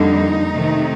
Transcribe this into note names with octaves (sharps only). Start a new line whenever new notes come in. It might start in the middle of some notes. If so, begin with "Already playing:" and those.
Already playing: F2 D3 G3 A#3 D#4
C3 D#3 A3